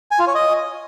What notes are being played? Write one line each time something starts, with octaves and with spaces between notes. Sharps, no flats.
G#5
F4
C#5
D#5